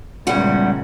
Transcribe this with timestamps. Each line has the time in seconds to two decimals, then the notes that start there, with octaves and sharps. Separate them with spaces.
0.27 E2 A#2 C#3 G3 G#3 F#5